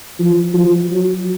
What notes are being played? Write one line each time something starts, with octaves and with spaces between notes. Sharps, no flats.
F3
F3
F#3